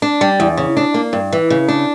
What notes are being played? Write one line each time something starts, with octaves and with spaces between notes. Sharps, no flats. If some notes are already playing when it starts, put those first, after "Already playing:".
D4
G3
E2
C#3
D4
A#3
G2
E3
C#3
D4